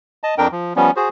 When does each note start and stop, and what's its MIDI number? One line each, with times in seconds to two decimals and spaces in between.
0.24 0.35 75
0.24 0.35 81
0.38 0.48 41
0.38 0.48 62
0.38 0.48 70
0.38 0.48 79
0.52 0.73 53
0.76 0.91 53
0.76 0.91 55
0.76 0.91 59
0.76 0.91 61
0.96 1.09 66
0.96 1.09 68
0.96 1.09 72